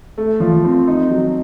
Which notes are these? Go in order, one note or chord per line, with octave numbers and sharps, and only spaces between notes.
A3
F3
C4
D#4
F#3